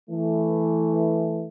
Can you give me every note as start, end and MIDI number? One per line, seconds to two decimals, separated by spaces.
0.10 1.48 52
0.10 1.48 57